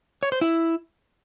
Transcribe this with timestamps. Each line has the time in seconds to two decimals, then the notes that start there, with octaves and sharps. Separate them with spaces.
0.23 C#5
0.32 C5
0.41 E4